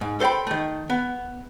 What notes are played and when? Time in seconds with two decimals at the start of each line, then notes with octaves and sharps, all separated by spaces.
0.01 G#2
0.20 A4 C5 D5 G5 B5
0.47 D#3 A3
0.90 B3